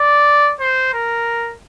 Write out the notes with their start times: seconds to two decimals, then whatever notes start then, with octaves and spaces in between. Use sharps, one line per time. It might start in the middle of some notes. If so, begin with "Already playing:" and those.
Already playing: D5
0.60 C5
0.94 A#4